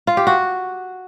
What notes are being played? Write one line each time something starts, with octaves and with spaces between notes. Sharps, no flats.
F4
G4
F#4